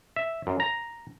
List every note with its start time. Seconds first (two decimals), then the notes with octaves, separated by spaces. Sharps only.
0.16 E5
0.47 F#2
0.60 A#5